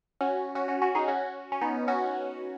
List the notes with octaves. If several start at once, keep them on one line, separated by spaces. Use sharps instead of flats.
C#4 F#4
C#4 F#4
C#4 F#4
C#4 F#4
D#4 G#4
C#4 F#4
C#4
B3 D#4
C#4 F#4